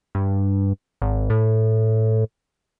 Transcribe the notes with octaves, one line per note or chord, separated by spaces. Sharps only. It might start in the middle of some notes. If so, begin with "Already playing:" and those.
G2
G#1
A2